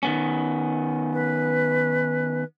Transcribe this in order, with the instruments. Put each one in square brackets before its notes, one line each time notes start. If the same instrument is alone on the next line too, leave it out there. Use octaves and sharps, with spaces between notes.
[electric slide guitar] D#3 B3 C#4
[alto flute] B4